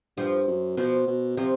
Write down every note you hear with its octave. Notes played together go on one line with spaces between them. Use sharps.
G2 F3
F#2
B2 F3
B2
C3 F3